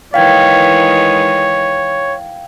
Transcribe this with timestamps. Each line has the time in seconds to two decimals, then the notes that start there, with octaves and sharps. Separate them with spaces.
0.14 D#3 E3 G#3 C#5 F5 G5 G#6